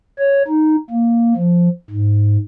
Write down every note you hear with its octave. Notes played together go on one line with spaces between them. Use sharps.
C#5
D#4
A#3
F3
G#2